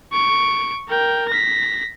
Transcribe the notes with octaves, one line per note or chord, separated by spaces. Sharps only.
C#6 D7
A#4 G5
A#6 B6